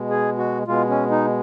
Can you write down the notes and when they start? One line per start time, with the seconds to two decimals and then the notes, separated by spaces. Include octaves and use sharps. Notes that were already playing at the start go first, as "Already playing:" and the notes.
Already playing: B2 G#3
0.10 G#4
0.38 F#4
0.67 B2 G#3 F4
0.89 C#4
1.11 D#4